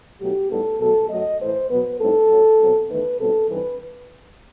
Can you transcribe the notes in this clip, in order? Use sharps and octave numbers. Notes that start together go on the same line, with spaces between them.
B2 F#3 A3 D#4 G4
A2 G3 B3 D#4 A4
B2 F#3 A3 A4
F#2 F#3 A3 D#5
A2 E3 A3 C5
B2 F#3 B3 B4
A2 G3 C4 D#4 A4
F#2 F#3 A3
B2 F#3 C4
E2 D#3 A3 D#4 B4
B2 G3 C4 D#4 A4
G2 E3 G3 C4 D#4 B4